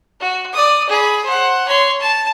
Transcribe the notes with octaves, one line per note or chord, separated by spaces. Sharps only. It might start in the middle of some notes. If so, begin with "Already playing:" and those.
F#4
D5 D#6
G#4 B5
C5 F#5
C#5 C6
A5